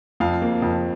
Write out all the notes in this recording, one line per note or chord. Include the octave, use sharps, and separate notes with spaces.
F2 F5
A#3
F2